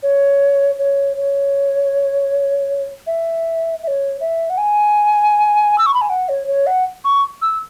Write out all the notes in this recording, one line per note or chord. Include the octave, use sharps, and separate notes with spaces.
C#5
C#5
C#5
E5
E5
C#5
E5
F#5
G#5
E6
C#6
B5
G#5
F#5
C#5
C#5
F#5
C#6
E6